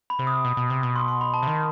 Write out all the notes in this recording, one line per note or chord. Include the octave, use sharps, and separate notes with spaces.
B5
C3
D#6
B2
B2
C3
B2
C6
C6
B5
A5
C3
D#3